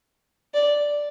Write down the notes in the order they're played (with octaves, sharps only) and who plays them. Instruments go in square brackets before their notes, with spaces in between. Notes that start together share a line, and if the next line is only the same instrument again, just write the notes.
[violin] D5